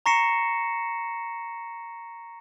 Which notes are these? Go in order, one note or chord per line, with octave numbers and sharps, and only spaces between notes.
A#5 C#6 A#6 C7 C#7 E7